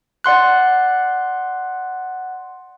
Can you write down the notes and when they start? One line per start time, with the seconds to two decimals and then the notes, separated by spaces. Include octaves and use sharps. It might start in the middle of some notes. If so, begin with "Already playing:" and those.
0.24 D5 F#5 C6 F#6